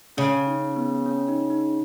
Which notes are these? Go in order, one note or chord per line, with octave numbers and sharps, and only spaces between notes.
C#3 C#4
D#4
B3
C#4
D#4
D#4